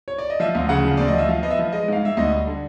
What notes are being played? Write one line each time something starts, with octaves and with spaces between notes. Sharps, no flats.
C#5
D5
D#5
F3 E5
D2 F5
C#3 F#5
F3
D2 D5
D#5
F3 E5
F3 F5
B3 D#5
E5
F3
G#3 D#5
G#2 F5
G#2 E5
D2 D#5
G3
D3